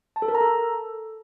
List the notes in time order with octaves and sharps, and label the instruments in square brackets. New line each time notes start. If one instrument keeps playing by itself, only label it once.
[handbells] A5
A4
A#4
A#5
A4